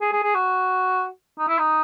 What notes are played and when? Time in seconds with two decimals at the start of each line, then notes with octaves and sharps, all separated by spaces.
0.01 G#4
0.13 G#4
0.24 G#4
0.35 F#4
1.39 D#4
1.48 E4
1.59 D#4